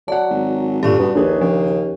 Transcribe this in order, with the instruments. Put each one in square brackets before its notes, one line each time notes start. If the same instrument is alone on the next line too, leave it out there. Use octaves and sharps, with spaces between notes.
[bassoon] F#3 [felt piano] D5 F#5 [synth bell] A5
[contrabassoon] G#1
[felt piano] G2 A#2 [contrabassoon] D3 [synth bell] G4 D5 C#6
[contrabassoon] G2 [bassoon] B3 [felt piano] D4 F#4
[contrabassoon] A#1 [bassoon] D#2 [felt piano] D4 G#4 B4
[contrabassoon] C#3 [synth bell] F3